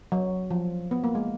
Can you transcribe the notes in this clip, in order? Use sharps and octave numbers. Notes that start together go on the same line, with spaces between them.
F#3
F3
B3
A#3
G#3